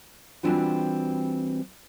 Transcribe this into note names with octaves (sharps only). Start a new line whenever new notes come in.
E3 G3 C4 D4 F4 F#4